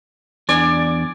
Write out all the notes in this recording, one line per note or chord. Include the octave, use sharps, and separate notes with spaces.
E2 D4 D5 G#5